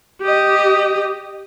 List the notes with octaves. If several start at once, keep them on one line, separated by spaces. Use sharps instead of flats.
G4 D#5